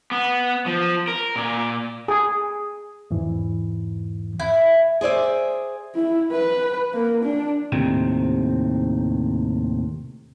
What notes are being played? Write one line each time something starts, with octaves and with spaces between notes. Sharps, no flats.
B3
F3
A#4
A#2
G#4
E2 G#2 E3
E4
G#4 C5 D5 E5
E4
B4
A#3
D4
D#2 A2 C3 D#3 C4